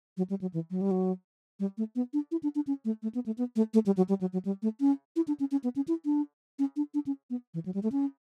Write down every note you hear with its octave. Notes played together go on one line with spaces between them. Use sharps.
F#3
G3
F#3
E3
F#3
G3
F#3
G3
A3
B3
D4
E4
D4
D4
C#4
A3
A3
B3
A3
B3
A3
A3
G3
F#3
G3
F#3
F#3
G3
A3
C#4
E4
D4
C#4
C#4
B3
C#4
E4
D4
C#4
D4
D4
C#4
B3
E3
F#3
G3
A3
C#4